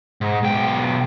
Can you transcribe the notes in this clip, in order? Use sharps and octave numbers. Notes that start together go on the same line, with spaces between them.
G#2
B1 G5